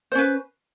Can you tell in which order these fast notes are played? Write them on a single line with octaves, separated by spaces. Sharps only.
C5 C#4 B4